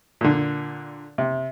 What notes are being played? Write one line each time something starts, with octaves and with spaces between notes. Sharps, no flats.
A#2 D3
C3